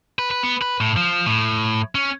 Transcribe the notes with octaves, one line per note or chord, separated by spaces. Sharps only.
B4
B4
B3
B4
A2
F3
A2
C#4